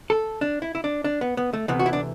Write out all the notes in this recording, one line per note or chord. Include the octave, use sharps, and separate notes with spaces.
A4
D4
E4
E4
D4
D4
B3
B3
A3
D2 C3 E3 B3
F#4
E4
D4